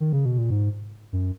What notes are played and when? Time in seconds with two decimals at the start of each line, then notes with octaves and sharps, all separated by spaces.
0.00 D#3
0.13 C#3
0.25 B2
0.38 A#2
0.50 G#2
1.13 F#2